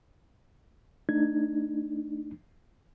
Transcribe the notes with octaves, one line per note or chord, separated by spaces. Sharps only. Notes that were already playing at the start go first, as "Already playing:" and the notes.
A3 D4 D#4 G#6